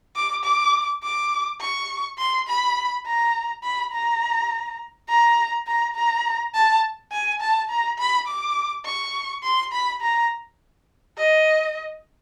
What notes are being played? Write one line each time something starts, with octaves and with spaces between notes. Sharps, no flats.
D6
D6
D6
C#6
C6
B5
A#5
B5
A#5
A#5
A#5
A#5
A5
G#5
A5
A#5
B5
D6
C#6
C6
B5
A#5
D#5